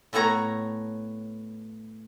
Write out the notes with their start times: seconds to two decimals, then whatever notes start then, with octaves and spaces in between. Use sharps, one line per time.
0.13 A2 A3 B3 C#5 A#5